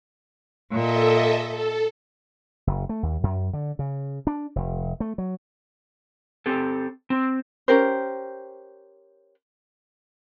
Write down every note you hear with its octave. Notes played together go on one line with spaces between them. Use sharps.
A#2 A4 D#5 E5
A4
F#1
A3
D#2
F#2
D3
C#3
D4
F1
A3
F#3
C4 G4 A4
C4
C#4 G4 A#4 C5